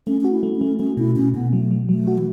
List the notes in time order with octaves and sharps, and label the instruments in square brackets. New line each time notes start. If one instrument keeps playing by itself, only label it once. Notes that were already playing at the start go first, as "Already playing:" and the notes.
[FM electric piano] A3 [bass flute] C#4
[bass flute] C#4 [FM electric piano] F#4
[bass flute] E4
[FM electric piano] A3
[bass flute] C#4
[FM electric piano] A3
[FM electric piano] A3 [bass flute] C#4
[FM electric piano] B2 [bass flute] E4
[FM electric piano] B2 [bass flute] C#4
[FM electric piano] B2 [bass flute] B3
[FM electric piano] F#3 [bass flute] A3
[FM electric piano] F#3
[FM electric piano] F#3 [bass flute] A3
[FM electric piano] F#4
[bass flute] E3